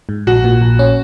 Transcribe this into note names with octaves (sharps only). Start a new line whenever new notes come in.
G#2
A#1 F#4
A#2
A#1
C#4